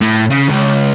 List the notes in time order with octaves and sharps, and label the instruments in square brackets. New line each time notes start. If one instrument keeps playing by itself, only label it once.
[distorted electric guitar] A2
C#3
C#2